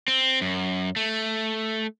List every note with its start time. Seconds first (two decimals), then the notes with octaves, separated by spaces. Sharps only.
0.08 C4
0.41 F#2
0.96 A3